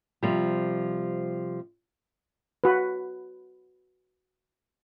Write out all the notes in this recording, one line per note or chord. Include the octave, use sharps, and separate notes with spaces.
C3 F3 G3
F#4 B4